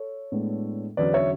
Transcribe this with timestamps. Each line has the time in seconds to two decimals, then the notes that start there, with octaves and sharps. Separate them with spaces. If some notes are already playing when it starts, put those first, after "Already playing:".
Already playing: A4 C#5
0.32 A2 G#3 B3 D4
0.97 E2 D3 F#3 C#4 B4 D5
1.14 C#5 E5